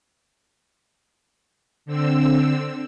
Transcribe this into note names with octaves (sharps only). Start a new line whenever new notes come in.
D3 C4 E6